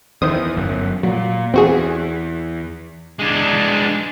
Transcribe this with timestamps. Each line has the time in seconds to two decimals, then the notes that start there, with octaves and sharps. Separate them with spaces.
0.22 E2 D#3 C5 D#6
0.56 G1 F#2
1.03 A#2 F#3
1.54 E2 C4 F#4 G#4
3.19 G#3 D4